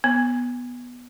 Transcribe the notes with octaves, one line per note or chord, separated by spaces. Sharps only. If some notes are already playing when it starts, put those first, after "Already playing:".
B3